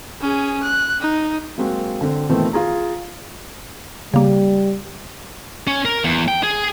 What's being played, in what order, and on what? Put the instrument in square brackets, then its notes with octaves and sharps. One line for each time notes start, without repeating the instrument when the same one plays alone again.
[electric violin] C#4 G#4
F#6
D#4
[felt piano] F#3 G#3 A#3 C4 F#4
D3 C4
A#2 D#3 E3 A3 B3 C4
F4 G#4 A#5
[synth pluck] C#3 A#3 [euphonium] G3
[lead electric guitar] C#4
A#4
E2
G5
G#4